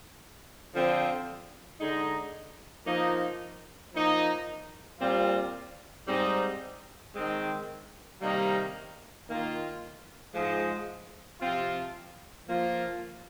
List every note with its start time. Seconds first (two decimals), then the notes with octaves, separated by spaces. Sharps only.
0.73 D3 F3 C4 F4
1.79 D3 G#3 D#4
2.86 F3 A#3 D#4
3.92 F3 A#3 D#4
4.99 A#2 G3 C4 F4
6.06 G#2 G3 C4 D#4
7.12 D#3 G#3 C4
8.20 C3 D#3 G3 A#3 D#4
9.27 D#3 A#3 F4
10.33 G#2 F3 G#3
11.40 C3 F3 C4 F4
12.47 F3 A#3 F4